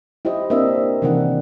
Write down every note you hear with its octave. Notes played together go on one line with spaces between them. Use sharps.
E4 G4 C5 D#5
A#3 C4 D4 D#5 E5
C3 D#3 E3 A#3 D4 F#5